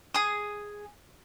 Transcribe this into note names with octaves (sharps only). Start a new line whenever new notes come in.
G#4 D#6